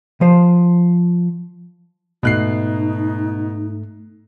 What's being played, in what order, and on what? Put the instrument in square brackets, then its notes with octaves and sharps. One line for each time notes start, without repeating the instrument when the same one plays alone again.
[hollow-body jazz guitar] F3 C5
[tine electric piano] G#2 A3 [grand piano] B2 F#6 C7 [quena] D#4